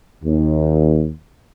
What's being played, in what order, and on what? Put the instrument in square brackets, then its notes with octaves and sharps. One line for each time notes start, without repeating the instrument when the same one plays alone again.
[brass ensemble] D#2